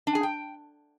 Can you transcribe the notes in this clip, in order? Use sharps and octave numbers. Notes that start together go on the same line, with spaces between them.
D4
G#4
G5